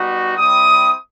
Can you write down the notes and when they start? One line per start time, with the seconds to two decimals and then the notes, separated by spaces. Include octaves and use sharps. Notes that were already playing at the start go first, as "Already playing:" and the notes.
Already playing: G3 B3 D#4 F#4
0.36 G3 C4 E4 D#6